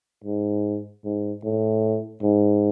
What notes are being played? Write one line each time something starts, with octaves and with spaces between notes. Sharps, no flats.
G#2
G#2
A2
G#2